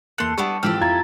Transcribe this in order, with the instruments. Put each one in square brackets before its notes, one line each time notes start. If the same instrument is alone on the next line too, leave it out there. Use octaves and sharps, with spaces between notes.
[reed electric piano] E2 A#3 F#6 [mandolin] A3 C6 [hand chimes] C#7
[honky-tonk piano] G3 [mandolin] B3 D4 E4 [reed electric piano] C#6
[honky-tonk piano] G#2 E3 F3 [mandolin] C4 G4 A4 [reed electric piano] F6
[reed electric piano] F2 E4 F5 [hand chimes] F4 A#5 A6 [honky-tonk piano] G#6